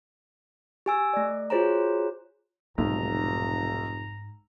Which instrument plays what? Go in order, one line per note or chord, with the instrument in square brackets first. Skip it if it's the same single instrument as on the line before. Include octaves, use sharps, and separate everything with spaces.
[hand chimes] G4 G#5 E6
A3 D5
F4 F#4 G#4 C5 C#5 A#5
[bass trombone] F1 [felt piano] B1 [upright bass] G#2 [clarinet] A#5